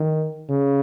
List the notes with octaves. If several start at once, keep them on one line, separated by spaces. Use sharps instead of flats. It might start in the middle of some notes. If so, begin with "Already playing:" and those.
Already playing: D#3
C#3